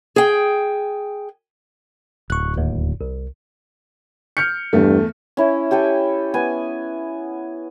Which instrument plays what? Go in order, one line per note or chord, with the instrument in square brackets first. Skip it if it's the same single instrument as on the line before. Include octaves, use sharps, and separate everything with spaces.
[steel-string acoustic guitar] G#4 G5
[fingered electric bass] D1 [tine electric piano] C#6 F#6
[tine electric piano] D#2
C2
[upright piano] F6 G6 C#7
[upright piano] E2 A3 [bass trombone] G2
[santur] C#4 E4
G4 A4 G5 G#5
B3 G#5